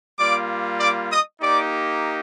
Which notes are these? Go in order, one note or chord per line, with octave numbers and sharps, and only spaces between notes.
G3 A#3 F4 D5 D6
D5 D6
D#5 D#6
A#3 D#4 G4 D5 D6